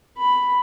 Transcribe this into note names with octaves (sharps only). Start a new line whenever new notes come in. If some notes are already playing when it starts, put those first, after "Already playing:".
B5